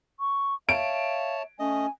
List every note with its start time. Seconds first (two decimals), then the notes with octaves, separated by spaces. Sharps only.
0.20 C#6
0.69 C#5 E5 F5 A5 D7
1.59 A3 C#4 D#5 G#5